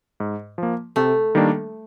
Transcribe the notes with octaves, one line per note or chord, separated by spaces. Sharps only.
G#2
F3 A#3
C3 A3
D#3 G3 A#3 D4